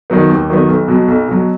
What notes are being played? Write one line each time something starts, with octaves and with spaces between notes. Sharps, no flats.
D#3 F#3 B3
D#2
D#3 F#3 B3
B1
B2 F#3
B1
B2 F#3